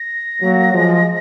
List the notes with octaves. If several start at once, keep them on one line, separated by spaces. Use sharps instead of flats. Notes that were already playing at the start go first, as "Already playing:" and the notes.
Already playing: A#6
F#3 A#3
F3 G#3